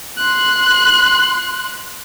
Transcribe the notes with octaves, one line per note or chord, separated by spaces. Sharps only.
C6 F#6